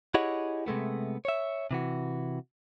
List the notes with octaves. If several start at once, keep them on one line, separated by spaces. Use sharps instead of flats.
E4 G4 G#4 C#5 D#5 F#5
C3 G#3 A3 B3
C#5 E5
C3 E3 F#4